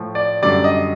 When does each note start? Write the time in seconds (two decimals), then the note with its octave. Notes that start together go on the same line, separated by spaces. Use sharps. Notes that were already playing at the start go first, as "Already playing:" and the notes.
Already playing: A2 F3
0.15 D5
0.42 F#2 D3 G3 D5
0.64 D#5